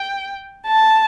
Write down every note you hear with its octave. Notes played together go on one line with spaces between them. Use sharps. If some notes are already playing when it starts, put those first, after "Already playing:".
Already playing: G5
A5